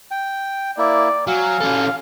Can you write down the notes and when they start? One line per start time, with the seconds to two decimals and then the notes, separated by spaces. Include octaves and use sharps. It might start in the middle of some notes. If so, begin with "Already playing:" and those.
0.11 G5
0.78 A#3 E4 D5
1.27 F#3 F5 G#5
1.61 C#4 A4